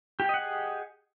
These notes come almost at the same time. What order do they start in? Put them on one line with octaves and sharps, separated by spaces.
G4 G5 D#5 F#5 G#4